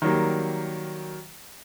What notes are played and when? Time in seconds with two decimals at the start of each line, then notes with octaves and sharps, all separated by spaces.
0.02 D#3 F#3 G3 A#3